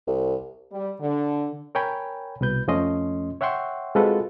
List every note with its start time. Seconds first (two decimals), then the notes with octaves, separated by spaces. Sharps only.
0.07 C2
0.72 G3
1.01 D3
1.75 A#4 C#5 G5 G#5 B5
2.41 C2 B2 B4 G6
2.67 F2 F3 A3 C#4 D#5 C6
3.41 C#5 E5 F#5 G5 C6 C#6
3.95 G#3 C4 F4 F#4 A4 B4